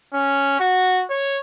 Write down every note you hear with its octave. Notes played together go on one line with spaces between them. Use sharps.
C#4
F#4
C#5